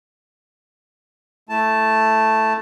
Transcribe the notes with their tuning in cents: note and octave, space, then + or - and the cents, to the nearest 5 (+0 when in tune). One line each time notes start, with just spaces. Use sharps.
A3 +0 E4 +0 A5 +0